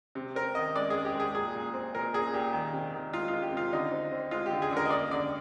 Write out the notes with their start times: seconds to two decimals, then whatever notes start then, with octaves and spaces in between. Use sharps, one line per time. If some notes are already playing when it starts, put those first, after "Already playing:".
0.15 C3
0.35 C4 A#4
0.55 D#3 D#5
0.75 G#3 D5
0.90 G#3 G#4
1.05 G4
1.14 G#3
1.20 G#4
1.35 A#2 G#4
1.55 A#2
1.74 C4
1.95 A#2 A#4
2.14 A#2 G#4
2.33 A#2 G4
2.53 D#3
2.73 C3
2.94 D#3
3.13 G#3 F4
3.28 F4
3.33 G#3
3.42 G4
3.52 C3 F4
3.72 D3 D#4
3.92 C4
4.11 C4
4.31 G#3 F4
4.46 D3 G4
4.62 G#4
4.71 D3
4.77 A#4
4.85 D#5
4.90 A#3 D5
5.11 D3 D5